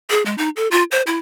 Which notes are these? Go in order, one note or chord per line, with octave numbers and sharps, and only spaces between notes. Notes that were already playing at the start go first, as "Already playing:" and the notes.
G#4
G#3
D#4
A4
F4
C5
E4